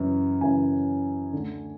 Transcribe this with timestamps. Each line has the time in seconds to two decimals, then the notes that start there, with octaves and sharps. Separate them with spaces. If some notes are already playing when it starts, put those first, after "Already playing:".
Already playing: F#2 C#3 E3
0.41 F#2 C#3 E3 G#5
1.33 D2 D3